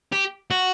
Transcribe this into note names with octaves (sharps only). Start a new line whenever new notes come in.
G4
F#4